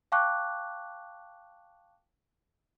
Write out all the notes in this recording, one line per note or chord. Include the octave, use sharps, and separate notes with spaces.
F5 G5 A5 C#6 D6 F#6